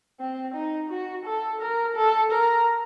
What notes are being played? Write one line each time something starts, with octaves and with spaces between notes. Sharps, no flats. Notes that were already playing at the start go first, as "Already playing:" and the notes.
C4
D#4
F#4
A4
A#4
A4
A#4